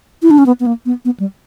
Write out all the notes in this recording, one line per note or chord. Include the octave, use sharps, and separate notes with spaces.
E4
D4
C#4
B3
B3
A#3
B3
B3
G3